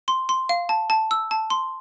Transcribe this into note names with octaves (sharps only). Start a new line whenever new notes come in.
C6
C6
F5
A5
A5
E6
A5
C6